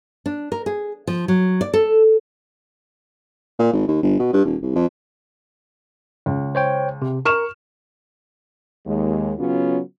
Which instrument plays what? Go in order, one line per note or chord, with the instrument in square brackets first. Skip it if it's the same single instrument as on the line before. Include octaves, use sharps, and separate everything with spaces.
[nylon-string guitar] D4
A#4
G#4
F3
F#3
D5
A4
[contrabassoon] A#2
G#1
D#2
G1
B2
G2
D#1
C2
F2
[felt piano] C#2
[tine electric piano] C5 C#5 G5
C3
[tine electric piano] A#4 [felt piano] C#6 F6 E7
[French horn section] D#2 G#3
C#3 F#3 B3 C#4 F4 F#4